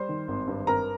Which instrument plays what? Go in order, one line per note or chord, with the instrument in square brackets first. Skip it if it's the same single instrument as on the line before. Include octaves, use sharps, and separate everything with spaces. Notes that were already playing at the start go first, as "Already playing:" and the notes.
Already playing: [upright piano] G3 C5 C6
D#3
G#1
G2
C4 A#4 A#5